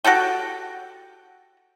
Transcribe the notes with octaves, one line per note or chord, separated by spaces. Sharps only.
F#4 G4 A4 G5